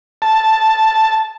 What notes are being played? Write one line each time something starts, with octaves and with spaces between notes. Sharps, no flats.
A5